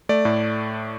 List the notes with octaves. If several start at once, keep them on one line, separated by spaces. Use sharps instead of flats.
A3 D5
A2